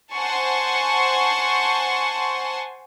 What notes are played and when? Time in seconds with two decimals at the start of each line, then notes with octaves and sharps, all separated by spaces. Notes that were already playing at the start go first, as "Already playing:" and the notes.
0.14 C5 F#5 G#5 A5 C6 C#6